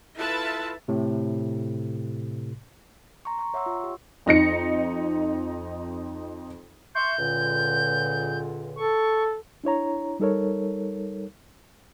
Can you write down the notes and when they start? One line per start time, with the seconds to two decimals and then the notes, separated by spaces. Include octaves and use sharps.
0.17 E4 F4 A4 B4 E5 A5
0.88 A2 C3
3.25 A#5 C6 C#6
3.39 A#5 C#6
3.54 C#5 E5 F#5 C6 C#6 E6
3.66 F4
3.84 G4
4.26 F2 D#4 A#6 C#7
6.95 E5 C6 C#6 G6
7.18 C#2 A#2 D3
8.76 A4 C#6
9.64 D4 E4 C#5 A#5
10.20 G3 D#4 A4 A#4 C#5